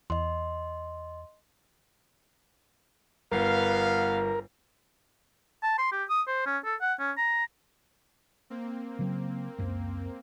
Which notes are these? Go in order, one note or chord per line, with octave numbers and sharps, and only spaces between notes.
E2 D#5 C6
G1 B3 A#4 F5
A5
C6
G4
D#6
C5
C#4
A4
F#5
C#4
A#5
A#3 C4
C#3 F#3
C#2 F#2